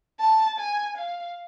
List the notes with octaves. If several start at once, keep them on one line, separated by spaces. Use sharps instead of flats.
A5
G#5
F5